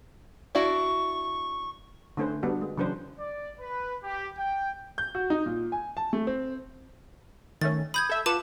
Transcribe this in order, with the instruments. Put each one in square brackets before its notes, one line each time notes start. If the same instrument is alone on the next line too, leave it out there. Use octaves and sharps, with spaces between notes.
[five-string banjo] D4 E4 F#4 [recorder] C#6
[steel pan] D3 A3 C#4 B4 C5
D3 G3 B3 D4 F#4
G#3
C#3 E3 F#3 D4 B4 C5
[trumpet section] D5
B4
G4
G5
[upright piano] G6
F#4
D#4
A#2
G#5
A5
A3
C4
[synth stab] D#3 A3 C#4 [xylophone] A6
[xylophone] B5 G6 G#6 [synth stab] D#6
[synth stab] A4 E5
[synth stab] F4 B4 F#5 [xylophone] A5 D6 E7